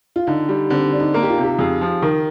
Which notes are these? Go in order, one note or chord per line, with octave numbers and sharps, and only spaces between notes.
F4
D3 D#4
G3
D3 C4
D4
D#4
A#3 D#4
G4
F4
C3
G4
F2 G#4
F3
D#3 A#4